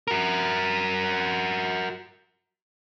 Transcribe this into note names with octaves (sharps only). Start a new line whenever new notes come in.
F#4 A#4